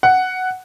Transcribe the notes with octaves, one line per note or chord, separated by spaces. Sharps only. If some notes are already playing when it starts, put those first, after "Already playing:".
F#5